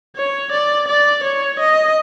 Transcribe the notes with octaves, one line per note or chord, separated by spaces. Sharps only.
C#5
D5
D5
C#5
D#5